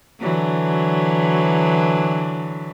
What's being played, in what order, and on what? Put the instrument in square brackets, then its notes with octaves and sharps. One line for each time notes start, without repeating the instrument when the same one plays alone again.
[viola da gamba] D3 E3 F#3